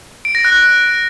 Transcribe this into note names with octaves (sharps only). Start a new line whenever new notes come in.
D7
A#6
F#6